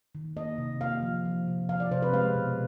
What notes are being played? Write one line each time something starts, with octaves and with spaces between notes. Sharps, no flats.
D#3
A#3 D#5
C3
A#3 F5
F3
F3
C3
F3 F5
D5
C3 C5
B4
G#3 F5
B2